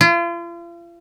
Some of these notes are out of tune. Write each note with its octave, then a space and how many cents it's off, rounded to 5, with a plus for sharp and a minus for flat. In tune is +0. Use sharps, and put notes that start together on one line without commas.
F4 -40